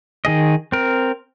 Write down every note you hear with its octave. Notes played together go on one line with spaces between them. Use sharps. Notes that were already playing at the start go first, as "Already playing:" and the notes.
D#3 G#4 D#5
C4 A#4